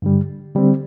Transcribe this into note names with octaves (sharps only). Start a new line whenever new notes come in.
G2 D3 G3
D3 G3 C4